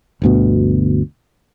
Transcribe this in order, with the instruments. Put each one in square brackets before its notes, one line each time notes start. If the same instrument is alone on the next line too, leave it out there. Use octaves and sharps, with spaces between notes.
[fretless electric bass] G1 D2 B2